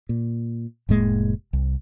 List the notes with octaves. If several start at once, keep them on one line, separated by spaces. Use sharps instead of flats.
A#2
F1 A2 G#3 A#3
C2